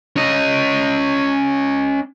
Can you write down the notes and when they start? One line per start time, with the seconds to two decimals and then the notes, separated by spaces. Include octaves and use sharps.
0.16 C#4 D#5